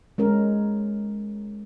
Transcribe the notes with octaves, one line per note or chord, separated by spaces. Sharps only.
G#3 C#4 A#4